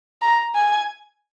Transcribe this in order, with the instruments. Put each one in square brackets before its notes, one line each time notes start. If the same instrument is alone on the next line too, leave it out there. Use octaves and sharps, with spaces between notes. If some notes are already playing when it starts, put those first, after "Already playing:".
[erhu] A#5
G#5